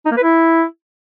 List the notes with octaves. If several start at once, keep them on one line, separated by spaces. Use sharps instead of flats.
D#4
A#3
B4
E4